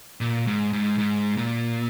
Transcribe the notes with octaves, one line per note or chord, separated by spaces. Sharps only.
A#2
G#2
G#2
G#2
A#2